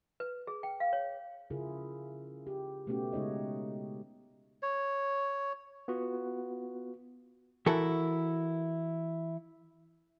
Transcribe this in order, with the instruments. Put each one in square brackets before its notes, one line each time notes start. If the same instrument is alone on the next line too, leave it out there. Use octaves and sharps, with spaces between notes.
[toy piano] B4
G#4
G5
F5
C#5
[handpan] C#3 E4 F4 G#4 A#4
G4
B2 A3 B3 C#4 F#4 G4
C#3 G#3 D#4 C#5 D#5
[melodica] C#5
[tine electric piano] B3 F4 F#4
[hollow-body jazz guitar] E3 E4 F#4 A4 A#4